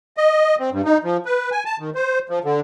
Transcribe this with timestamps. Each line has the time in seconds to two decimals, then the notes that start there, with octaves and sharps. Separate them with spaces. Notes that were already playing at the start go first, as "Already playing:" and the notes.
0.17 D#5
0.59 C4
0.72 G2
0.85 D#4
1.04 F3
1.25 B4
1.51 G#5
1.65 A5
1.79 D#3
1.95 C5
2.29 F3
2.44 D3